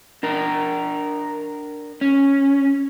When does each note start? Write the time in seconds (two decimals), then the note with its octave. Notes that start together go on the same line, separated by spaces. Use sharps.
0.23 D4 A#4
2.01 C#4